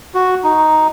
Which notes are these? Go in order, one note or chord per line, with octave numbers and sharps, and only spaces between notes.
F#4
D#4